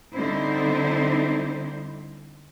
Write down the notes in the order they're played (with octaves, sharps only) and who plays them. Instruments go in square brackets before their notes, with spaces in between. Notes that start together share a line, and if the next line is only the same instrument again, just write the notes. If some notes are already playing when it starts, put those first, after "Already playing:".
[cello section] D3 G3 C4 D#4 E4 C5